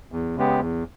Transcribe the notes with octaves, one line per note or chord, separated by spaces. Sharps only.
E2
C#3 G#3 B3 G4
E2